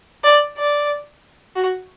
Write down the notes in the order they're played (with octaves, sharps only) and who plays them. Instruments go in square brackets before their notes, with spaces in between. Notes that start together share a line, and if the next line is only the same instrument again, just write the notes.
[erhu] D5
D5
F#4